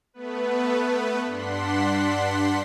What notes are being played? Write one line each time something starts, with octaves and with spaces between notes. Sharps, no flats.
A3 B3 B4
G2 D4 F#5 C6 B6